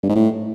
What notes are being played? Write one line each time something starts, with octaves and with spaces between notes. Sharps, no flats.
G2
G#2
A2